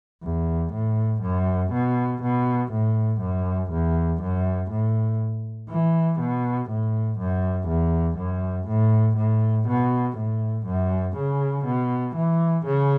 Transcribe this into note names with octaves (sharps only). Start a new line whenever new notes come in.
E2
A2
F#2
B2
B2
A2
F#2
E2
F#2
A2
E3
B2
A2
F#2
E2
F#2
A2
A2
B2
A2
F#2
C#3
B2
E3
C#3